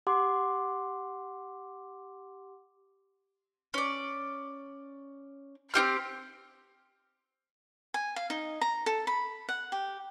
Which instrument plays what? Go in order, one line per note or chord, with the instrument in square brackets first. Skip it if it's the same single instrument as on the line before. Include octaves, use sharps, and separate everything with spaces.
[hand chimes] G4 F#5 C6 D6
[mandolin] C#4 D5
C4 D#4 G4 F6
[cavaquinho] G#5
F5
D#4
A#5
A4
B5
F#5
G4